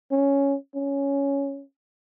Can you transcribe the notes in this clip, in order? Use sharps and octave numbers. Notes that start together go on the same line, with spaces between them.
C#4
C#4